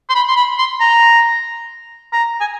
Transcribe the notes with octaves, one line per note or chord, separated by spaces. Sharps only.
C6
B5
C6
B5
C6
A#5
A#5
G#5